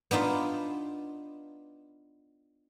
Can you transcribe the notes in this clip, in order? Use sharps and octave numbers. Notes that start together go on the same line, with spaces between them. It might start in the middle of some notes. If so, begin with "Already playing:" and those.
B3 D4 D#4 F4